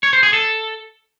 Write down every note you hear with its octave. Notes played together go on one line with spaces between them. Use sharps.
C#5
C5
G#4
A4